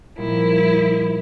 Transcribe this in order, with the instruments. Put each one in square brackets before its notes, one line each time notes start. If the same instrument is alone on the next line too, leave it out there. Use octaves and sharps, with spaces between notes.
[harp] A#2 G3 D#4 [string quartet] F3 E4